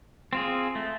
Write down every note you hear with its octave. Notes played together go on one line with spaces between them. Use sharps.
C4 F4 G#4
A3